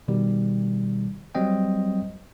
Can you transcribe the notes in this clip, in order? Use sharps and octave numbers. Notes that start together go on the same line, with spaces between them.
B2 D#3 G3
F#3 G3 C4 D#5 G5